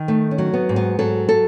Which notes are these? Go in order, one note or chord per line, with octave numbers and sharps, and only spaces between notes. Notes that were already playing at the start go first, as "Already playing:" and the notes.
Already playing: D#3
A3 D#4
C#4
F#3
B3
G#2
B3
F#3 A4
A4